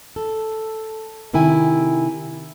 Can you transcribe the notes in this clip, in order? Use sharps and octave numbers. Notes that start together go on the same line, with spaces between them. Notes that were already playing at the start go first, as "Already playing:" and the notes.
A4
C3 D#3 E4 G5 G#5